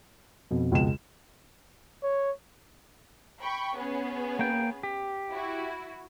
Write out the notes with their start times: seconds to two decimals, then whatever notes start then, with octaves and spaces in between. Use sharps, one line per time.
0.51 F2 B2
0.72 C#2 G#3 E7
2.03 C#5
3.41 G5 B5 C#6
3.77 B3 C#4 G#4
4.39 A#3 G5
4.83 G4
5.32 E4 F#4